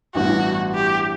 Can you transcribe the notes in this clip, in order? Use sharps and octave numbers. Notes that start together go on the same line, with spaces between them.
A1 G2 E3 B3 E4 F#4
G4